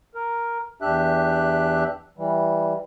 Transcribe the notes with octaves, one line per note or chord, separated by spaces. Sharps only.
A#4
E2 D4 G4 E5 F#6
E3 G3